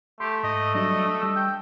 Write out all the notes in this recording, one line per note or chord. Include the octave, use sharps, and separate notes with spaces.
A3 G4 C6
G#2 D#5
F#3 G3 D4 D#5
G3 E6
G5